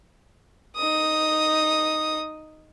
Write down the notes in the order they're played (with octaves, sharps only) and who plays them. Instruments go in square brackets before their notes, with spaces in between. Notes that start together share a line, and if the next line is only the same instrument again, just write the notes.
[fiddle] D#4 D#6